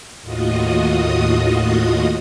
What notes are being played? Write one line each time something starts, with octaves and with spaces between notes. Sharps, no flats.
D#2 A2 F4 F#4 D#5 D#6